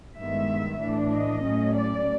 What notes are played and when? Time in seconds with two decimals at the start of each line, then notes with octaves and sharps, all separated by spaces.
0.18 G2 D#3 G#3 B3 E5
0.80 A2 E3 A3 D4
1.12 D#5
1.44 A2 F#3 A3 C#4
1.75 D5